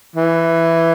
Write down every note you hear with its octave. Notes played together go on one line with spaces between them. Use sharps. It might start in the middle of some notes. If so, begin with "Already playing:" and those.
E3